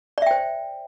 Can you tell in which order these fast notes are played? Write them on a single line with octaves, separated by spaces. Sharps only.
D5 E5 G5 C5